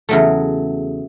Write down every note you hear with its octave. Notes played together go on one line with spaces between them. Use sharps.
E2 C#3 F#3 A3